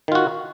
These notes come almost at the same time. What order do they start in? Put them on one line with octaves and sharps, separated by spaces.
D#3 F4 F#4